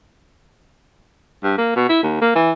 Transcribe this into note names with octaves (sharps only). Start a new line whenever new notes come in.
G2
A#3
B2
E4
D#2
A#3
E3